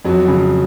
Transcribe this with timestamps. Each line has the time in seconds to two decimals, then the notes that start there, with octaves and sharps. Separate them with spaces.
0.05 F2 F#3
0.28 C#3